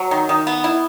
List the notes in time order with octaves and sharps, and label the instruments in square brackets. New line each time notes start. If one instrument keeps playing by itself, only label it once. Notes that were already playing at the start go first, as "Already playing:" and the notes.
Already playing: [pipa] F#3
D#3
D#3
B3
E4